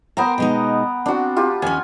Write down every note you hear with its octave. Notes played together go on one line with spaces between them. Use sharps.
B3 A#4 C5 G5 A#5
B2 G#3 D#4
C4 D4 F#4
F4 G4
D#2 C#4 G#5